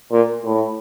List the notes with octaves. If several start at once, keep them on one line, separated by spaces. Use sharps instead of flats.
A#2
A2